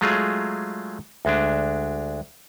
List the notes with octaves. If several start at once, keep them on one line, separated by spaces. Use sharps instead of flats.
F#3 G#3 A3 F4 G#4
D2 G#3 D4